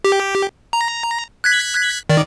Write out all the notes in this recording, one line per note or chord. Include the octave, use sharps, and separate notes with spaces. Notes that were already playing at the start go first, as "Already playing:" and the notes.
G4
A#5
F#6 G#6 B6
D#3 D5